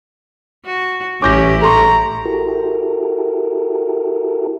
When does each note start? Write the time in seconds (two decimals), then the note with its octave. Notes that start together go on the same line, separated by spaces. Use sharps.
0.66 F#4
1.22 A1 C#4 E4 G4 D6 G6 A#6
1.62 A4 A#5 C6 C#6
2.25 E4 F#4 G4 A4 A#4